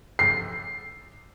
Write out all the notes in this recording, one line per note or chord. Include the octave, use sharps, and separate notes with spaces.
C7